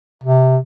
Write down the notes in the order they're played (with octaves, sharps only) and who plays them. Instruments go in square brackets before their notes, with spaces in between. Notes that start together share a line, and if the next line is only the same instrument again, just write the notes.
[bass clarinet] C3